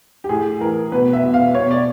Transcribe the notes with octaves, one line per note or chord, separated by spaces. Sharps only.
G4
A2 G#4
E3 A#4
B2 B4
E5
B2
F5
B2 C#5
D5